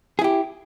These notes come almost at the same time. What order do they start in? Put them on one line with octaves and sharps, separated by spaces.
G#4 E4 G4